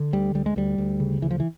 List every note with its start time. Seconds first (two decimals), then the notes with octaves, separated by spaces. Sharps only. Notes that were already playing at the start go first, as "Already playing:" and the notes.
Already playing: D3
0.13 D2 G3
0.35 D2 G3
0.46 G#3
0.56 D2 G3
0.78 D2
1.00 C#3
1.22 D2 E3
1.31 F3
1.40 E3